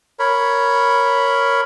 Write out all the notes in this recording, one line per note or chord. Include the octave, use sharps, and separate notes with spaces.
A#4 C#5 B5